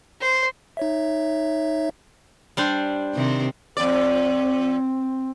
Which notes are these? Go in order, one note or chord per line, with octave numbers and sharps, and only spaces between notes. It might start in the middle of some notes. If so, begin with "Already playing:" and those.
C5
D#4 C#5 E5
G3 D4 C5
C3 D#3 C4
F2 C4 D5